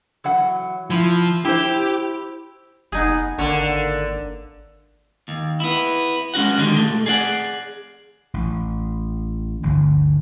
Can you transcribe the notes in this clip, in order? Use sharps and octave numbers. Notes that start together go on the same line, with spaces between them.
E3 F#3 F#5
F3 E4
E4 G4 C5
F1 B3 D#4 G#4
G#1 D3 A#3 C#5
D#2
B3 E4
G#3 C#4 F#4 F#5
D3 D#3 G3 G#3
A#2 A3
G#4 D5 F#5
A1
G1 D2